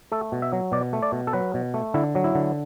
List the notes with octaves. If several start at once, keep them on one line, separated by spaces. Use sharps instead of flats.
A3 A4
B2
E5
F#3
B2 D5
A3
D5
B2
A4
F#3 B4
B2
A3
D3 E4
F#3
E4
D3